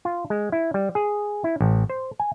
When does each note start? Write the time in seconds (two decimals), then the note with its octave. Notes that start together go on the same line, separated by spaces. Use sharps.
0.05 F4
0.30 G#3
0.52 E4
0.74 G3
0.95 G#4
1.44 E4
1.61 A1
1.90 C5
2.19 G#5